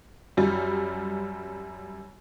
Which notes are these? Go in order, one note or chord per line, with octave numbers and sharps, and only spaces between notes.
F#2 G3